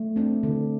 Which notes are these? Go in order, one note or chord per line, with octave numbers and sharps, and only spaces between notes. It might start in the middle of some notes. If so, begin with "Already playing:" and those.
Already playing: A3
C4 D4
D3